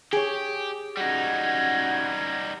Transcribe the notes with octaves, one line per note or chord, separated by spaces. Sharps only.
G4 G#4 C#5
G3 C#4 D#4 F#4 G#6